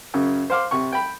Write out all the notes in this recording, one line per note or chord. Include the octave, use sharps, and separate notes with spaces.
F#2 C#3
C5 F5 D6
C3 C#6
G5 B5